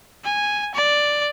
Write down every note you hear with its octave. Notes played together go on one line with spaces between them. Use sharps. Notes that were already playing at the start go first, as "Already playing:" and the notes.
G#5
D5